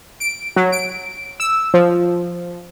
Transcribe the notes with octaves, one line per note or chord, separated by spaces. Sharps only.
D7
F#3
D7
E6
F3